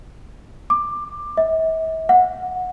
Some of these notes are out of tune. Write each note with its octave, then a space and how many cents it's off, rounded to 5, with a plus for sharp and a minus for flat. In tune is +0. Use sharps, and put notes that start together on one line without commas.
D6 +15
E5 -40
F#5 -20